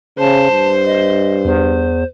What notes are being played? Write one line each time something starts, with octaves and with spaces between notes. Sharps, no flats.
C#3 C5 A5
G2
D#5
E2 C5